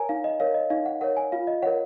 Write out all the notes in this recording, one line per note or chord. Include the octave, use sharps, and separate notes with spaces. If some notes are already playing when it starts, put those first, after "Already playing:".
Already playing: A#4 C#5 G#5 A#5
D#4 F5
D#5
A#4 C#5 F5
D#5
D#4 F5
F#5
A#4 C#5 F#5
G#5
F4 F5
D#5
A#4 C#5 F#5